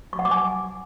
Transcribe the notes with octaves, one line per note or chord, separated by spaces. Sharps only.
C#6
F#5
D6
G#5